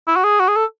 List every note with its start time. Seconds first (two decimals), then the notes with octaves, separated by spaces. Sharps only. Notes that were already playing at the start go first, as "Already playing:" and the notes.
0.08 E4
0.16 F#4
0.24 G#4
0.40 F#4
0.48 G#4
0.56 A4